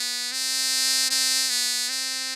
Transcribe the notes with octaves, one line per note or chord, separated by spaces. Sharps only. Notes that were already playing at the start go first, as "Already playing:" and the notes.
Already playing: B3
C4
C4
B3
C4